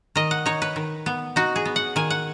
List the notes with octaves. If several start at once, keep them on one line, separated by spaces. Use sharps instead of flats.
D#3 D#5
F#5
D#4 C#5
B4
D#3
B3
D#4 F#4
G#4
B3
F#5
D#3 G#5
F#5